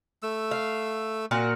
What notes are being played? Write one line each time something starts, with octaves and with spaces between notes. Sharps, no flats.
A3 E6
F5
A#2 F#4 A#4